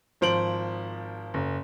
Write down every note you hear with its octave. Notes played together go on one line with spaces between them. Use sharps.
G#1 F3 C5 D7 F#7
F#1